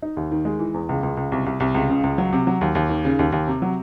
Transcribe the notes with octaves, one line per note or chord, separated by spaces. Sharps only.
D#4
D#2
D#3
G#3
E3
E2
C#2
C#2
C#2
C2
C2
C2
C#2
C#3
C#2
F#3
C3
F#3
D#2
D#2
D#3
C#3
D#2
D#2
C3
F#3